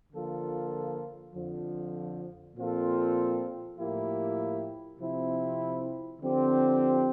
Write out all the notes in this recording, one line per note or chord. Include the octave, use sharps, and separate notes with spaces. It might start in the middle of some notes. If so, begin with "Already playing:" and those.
D3 F3 A#3 F4 A4
F2 D3 F3
A#2 F3 C4 F4 A4
A2 F3 A#3 E4 G4
C3 F3 C4 E4
D3 F3 C4 G4